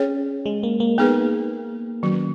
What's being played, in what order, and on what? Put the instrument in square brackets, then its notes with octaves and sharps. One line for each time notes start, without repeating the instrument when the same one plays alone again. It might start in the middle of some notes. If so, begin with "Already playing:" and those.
Already playing: [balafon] C#4 G#4 C#5
[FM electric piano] G#3
A#3
A#3
[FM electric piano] A#3 [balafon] B3 D#4 G#4 B4
[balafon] D#3 F#3 C#4 F#4